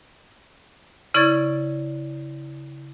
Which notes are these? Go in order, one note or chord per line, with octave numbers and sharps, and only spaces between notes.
C#3 E4 D5 C#6 G#6 A6